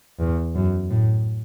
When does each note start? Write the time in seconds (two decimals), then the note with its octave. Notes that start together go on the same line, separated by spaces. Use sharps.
0.20 E2
0.55 F#2
0.91 A2